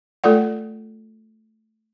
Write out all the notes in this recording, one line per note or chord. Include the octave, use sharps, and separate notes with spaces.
A3 F4 A4 D5 F#5